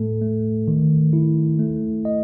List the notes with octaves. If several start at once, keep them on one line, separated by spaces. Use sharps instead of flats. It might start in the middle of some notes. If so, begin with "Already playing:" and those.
Already playing: A2 A3 A4
A3
D#3
E4
A3
D#5